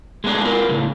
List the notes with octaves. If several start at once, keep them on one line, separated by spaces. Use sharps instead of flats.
G#3 A3 B3 D4 G#4
F4 A#4 B4
A2 C#3 G#3